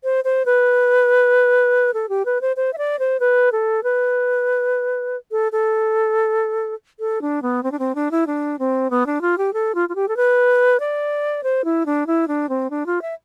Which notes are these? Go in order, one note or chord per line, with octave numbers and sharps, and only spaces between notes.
C5
C5
B4
A4
G4
B4
C5
C5
E5
D5
C5
B4
A4
B4
A4
A4
A4
D4
B3
C4
D4
C4
D4
E4
D4
C4
B3
D4
F4
G4
A4
F4
F4
G4
A4
B4
D5
C5
E4
D4
E4
D4
C4
D4
F4
E5